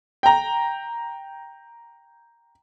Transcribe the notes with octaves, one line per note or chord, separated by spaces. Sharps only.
G5 A#5